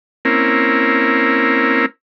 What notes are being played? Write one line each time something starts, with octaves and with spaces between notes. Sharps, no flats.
A#3 C4 C#4 E4 A#4